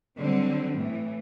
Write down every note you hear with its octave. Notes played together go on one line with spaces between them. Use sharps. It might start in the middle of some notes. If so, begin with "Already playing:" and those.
D3 F#3 G3 C4
A2 E3